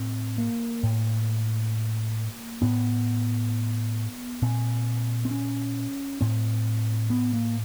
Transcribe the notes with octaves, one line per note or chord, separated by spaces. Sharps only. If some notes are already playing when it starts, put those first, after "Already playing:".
Already playing: A2 C4
A#3
A2
A2 B3
A#2 C4
C4
C#4
A2 C4
B3
A#3